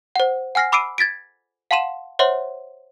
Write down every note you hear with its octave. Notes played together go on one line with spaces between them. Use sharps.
C5 F#5
F#5 G#5 F6 A#6 C7
B5 D6 E6 C7 D7 D#7
G#6 A6 B6 D7
F5 F#5 A5 C6 D#7 E7
C5 C#5 E5 F#5 C6